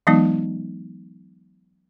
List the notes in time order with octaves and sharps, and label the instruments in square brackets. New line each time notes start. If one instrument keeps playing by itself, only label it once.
[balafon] E3 F#3 G#3 B3 D#4